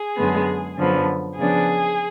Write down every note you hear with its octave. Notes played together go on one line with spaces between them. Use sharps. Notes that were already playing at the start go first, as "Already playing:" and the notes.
Already playing: G#4
F#2 D3 G#3 B3
F#2 D3 F3 B3
C#3 F3 B3 D4 G#4